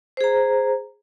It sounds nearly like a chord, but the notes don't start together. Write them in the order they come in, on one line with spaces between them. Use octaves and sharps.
C5 G#4 A#5